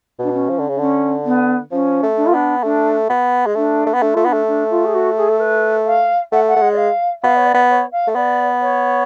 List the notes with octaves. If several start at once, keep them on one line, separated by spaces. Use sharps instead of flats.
B2 D4
C#4
F3
D3
C#3
D4
D3 C#4
B3
F3 C#4
A3
D4
F4
B3 D4
A3 D4
B3
G#3
A3 D4
A3
B3
A3 D4
A3 F4
B3 D4
A3
D4
F4
G#4
F#4
G#4
A4
B4
F5
A3 F#5
F#5
A3
G#3
D5
F5
B3 F5
C#5
D5
B3
C#5
F5
A3
B3 D5
C#5